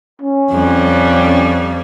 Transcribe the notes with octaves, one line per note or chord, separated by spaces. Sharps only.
C#4
F2 G3